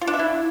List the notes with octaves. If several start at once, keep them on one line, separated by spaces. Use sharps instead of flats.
F4
D4
E5
E4